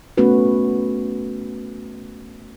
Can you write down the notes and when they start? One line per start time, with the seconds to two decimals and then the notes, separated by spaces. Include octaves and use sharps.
0.18 A3 B3 C#4 F#4 B4